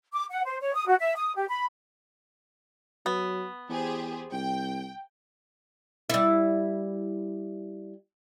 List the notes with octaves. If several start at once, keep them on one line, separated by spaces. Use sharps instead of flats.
D6
F#5
C5
C#5
D#6
F#4
E5
D#6
G4
B5
F#3 B3
E2 G4 G#4 C5
C2 G5
G3 E4